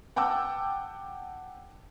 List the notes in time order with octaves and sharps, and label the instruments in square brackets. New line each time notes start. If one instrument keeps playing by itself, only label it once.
[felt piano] F#5 G5 A5 D6 E6